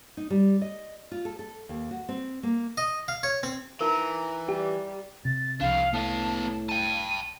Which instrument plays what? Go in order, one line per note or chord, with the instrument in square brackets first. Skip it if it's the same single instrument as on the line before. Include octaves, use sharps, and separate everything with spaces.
[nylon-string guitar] D#4
G3
D#5
F4
A4
A4
D#2
F#4
C4
A#3
[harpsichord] D#5
F5
C#5
C4
[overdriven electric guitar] E3 [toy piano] D#4 A#4 [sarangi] A#5
[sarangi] G3 [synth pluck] G4
[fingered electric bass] C3 [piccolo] A6
[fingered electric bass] C2 [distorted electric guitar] D4 G#4 [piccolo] F5
[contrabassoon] A2 [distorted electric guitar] B3 F5 [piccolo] A5
[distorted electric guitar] G5 A5 [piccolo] D#7